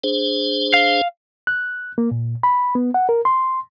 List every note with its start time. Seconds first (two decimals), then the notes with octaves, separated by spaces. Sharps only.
0.04 D4 G#4 C5
0.74 F5
1.47 F#6
1.98 A#3
2.11 A#2
2.43 B5
2.75 B3
2.94 F#5
3.09 A#4
3.25 C6